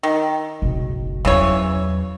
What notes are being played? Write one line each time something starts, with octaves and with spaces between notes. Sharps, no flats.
D#3
F#1 B1
E2 C#3 E3 F#3 C#5